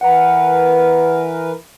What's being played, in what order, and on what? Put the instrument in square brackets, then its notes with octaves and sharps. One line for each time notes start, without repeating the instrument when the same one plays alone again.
[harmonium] E3 A#4 B4 [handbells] F#5 A#5